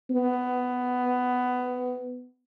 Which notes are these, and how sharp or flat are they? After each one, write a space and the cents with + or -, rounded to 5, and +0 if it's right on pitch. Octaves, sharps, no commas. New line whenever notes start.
B3 +15